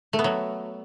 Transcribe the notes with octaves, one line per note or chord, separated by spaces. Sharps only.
A3
B3
F#3